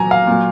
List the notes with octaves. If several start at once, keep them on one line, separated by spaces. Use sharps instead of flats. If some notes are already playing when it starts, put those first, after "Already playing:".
Already playing: A#2 F#3 G#5 A#5
F5
A#2 F#3